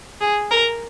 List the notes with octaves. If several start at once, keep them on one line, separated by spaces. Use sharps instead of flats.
G#4
A#4